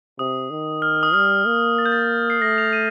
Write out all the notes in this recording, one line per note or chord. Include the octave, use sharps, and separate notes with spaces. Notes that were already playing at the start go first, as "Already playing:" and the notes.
C3 D#6
D#3
F6
D#6
G3 F6
A#3
A6
G6
A6
C7
A3 A#6
F7
D#7